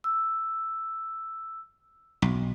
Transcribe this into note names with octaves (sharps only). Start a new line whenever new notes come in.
E6
B1